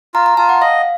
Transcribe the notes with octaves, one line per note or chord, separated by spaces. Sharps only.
F4 A#5
A#5
F4 A5
F#5
D#5 F5